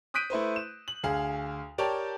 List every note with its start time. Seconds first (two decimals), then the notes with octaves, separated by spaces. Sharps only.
0.14 D#6 F#6 G6 B6 D7 D#7
0.30 A3 E4 B4 C5
0.56 E7
0.88 F#7
1.04 D2 G#4 F5
1.78 G4 A#4 C#5 D5 G5 A5